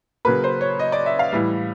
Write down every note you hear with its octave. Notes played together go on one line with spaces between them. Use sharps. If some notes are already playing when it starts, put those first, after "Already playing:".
C#3 F#3 A#3 B4
C5
C#5
D#5
D5
E5
F5
A2 E3 G3